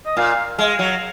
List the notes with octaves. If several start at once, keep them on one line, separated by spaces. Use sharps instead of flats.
D#5
A#2 F5
G#3 F5
F#3